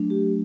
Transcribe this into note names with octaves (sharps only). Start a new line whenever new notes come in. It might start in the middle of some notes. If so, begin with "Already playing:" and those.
Already playing: F#3 A3 D4
G4